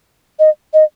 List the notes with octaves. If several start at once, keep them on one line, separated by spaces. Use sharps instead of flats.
D#5
D#5